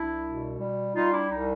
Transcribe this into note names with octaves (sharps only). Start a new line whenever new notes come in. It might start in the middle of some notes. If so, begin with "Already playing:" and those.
Already playing: C2 D4 E4
B2
G3
G3 D#4 F4
D4 E4
C2 D#4